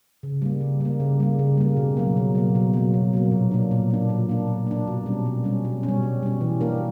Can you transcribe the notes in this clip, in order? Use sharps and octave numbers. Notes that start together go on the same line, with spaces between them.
C#3
G3 A#3
C#3
G3 A#3
C#3
G3 A#3
C#3
G3 A#3
B2
F#3 A#3
B2
F#3 A#3
B2
F#3 A#3
B2
F#3 A#3
A#2
A#3 D4
A#2
A#3 D4
A#2
A#3 D4
A#2
A#3 D4
B2
G3 C#4
B2
G3 C#4
B2
C#4
G3
B2
G3 C#4
E3
A#3 D4 G4 A#4